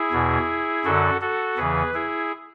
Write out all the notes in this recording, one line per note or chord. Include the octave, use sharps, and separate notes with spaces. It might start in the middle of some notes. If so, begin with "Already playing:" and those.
Already playing: E4 G#4
E2 B2
F#2 D3 F#4 A4
F#4 A4
E2 C#3 E3 G#4 B4
E4 G#4